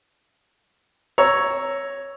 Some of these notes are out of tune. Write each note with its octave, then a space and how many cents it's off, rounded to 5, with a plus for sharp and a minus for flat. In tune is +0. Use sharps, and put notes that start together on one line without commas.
C#5 +0 A#5 +0 E6 +0